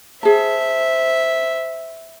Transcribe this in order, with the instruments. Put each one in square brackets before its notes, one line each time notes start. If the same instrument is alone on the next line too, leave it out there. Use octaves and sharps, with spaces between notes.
[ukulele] G#4 A5 [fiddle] C5 E5